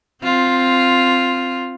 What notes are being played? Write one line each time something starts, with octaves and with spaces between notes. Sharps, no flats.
C4 F4